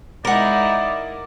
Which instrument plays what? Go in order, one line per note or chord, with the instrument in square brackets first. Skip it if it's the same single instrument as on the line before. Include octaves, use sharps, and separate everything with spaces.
[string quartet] G#3 D#4 E4 [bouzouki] A#4 F#5 [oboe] D5